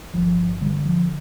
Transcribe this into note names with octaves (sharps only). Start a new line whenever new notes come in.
G1 F3
D3 G3
F3